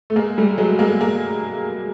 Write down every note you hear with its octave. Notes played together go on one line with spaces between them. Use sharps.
A3
G#3 A#3
G3 A3
F#3 G#3
G#3 A#3
G#3 A#3